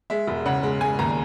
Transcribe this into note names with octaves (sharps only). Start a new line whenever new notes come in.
G#3 E5
E1
C#3 F#5
G#3
G#3 G#5
D#2 A#5